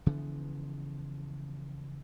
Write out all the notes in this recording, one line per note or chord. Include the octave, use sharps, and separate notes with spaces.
C#3 E3 F3 B3